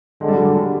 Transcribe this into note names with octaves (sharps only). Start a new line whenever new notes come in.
D3 G#3
G3
F#3
G3